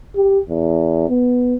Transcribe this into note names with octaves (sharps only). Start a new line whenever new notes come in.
G4
E2
B3